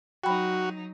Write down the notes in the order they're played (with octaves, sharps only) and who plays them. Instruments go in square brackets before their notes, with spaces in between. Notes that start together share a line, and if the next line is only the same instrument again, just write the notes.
[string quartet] F#3 D#4 [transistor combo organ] F#4 [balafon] G5 B5